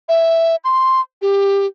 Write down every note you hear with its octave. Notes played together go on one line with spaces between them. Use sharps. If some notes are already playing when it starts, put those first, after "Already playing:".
E5
C6
G4